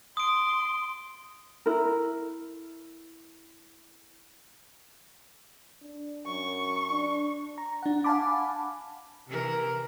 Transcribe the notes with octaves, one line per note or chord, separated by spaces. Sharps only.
C6 D#6 D7
E4 A#4
D4
F#2 C#6
D4
A#5
D4 F#5
F5 F#5 G#5 A5 B5 D6
C3 E3 A#4